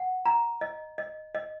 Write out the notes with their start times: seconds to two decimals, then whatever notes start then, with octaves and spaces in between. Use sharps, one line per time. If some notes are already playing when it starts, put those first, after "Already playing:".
Already playing: F#5
0.26 A#5
0.61 D#5
0.98 D#5
1.35 D#5